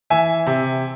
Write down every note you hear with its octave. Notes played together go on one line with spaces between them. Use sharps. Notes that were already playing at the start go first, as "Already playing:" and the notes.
E3 E5 G#5
C3